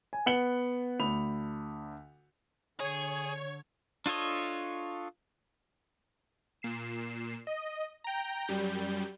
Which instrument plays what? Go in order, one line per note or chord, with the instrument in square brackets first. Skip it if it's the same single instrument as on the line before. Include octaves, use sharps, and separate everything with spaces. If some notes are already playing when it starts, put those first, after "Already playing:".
[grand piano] G#5
B3 F#5 C#7 F#7 G7
D2 B5 F7
[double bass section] D3 [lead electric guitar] G#4 [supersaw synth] C#5 G#6
[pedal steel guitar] D4 F4 A4 C#5 D#5
[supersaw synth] A#2 C7 E7
D#5
G5 A#5
F#2 G3 G6